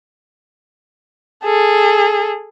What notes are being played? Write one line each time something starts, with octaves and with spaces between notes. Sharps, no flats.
G#4 A4